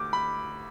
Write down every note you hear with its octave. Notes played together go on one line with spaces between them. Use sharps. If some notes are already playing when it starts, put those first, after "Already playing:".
Already playing: D2 D6
B5